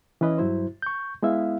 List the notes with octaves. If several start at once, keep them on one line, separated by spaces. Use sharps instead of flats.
E3 C#4 B4 D#5
G2 F#3 E4 C5
C#6 G6
G#3 B3 E4 E5 F5